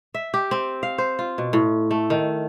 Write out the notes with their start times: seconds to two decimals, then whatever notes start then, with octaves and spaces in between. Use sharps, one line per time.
0.14 E5
0.34 G4
0.51 C4
0.83 F5
0.98 C5
1.19 F4
1.38 B2
1.53 A2
1.91 A3
2.10 D#3